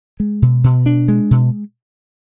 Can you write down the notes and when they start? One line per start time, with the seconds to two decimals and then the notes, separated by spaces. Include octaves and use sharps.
0.20 G#3
0.42 B2
0.64 B2
0.86 D4
1.08 G#3
1.31 B2